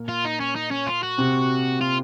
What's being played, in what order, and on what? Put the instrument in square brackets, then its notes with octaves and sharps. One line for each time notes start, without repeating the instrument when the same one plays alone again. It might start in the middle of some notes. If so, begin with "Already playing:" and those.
Already playing: [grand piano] A#2 A#3
[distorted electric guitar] F4
D#4
C#4
D#4
C#4
F4
F#4
[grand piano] C3 C4
[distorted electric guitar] F4